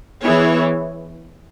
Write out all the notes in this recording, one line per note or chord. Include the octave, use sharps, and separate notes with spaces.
E3 B3 E4 G#4 C#5